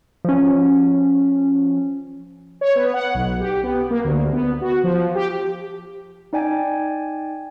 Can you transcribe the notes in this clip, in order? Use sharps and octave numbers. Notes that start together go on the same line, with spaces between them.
F3 C#4
C#5
B3
F#5
B1
G4
B3
A#3
D2
B3
F#4
F3
G4
D#4 D5 G5 G#5